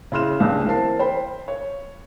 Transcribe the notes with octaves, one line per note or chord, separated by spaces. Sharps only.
C#3 E4 C6 F6 E7
C#2 D4 G4
E3 C4 A#4 A5 C7
C5 G5 B5
C#5